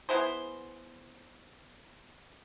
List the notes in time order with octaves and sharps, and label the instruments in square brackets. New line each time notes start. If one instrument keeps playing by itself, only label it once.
[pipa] B3 E4 G#4 C5